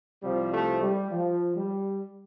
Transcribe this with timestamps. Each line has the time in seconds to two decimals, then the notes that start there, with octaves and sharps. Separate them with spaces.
0.22 C2 C3 F3 G3
0.52 A3
0.81 G3
1.11 F3
1.56 G3